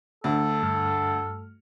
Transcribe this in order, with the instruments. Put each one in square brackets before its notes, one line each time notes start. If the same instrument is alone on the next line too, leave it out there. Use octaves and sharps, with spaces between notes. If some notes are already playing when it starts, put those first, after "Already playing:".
[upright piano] D2 [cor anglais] A4
[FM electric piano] G2 A3 F6